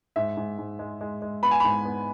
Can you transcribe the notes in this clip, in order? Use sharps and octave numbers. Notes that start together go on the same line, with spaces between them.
G#2 E5
G#2
G#2
G#3
G#3
G#3
B3 B5
G#5
G#2 B5
B3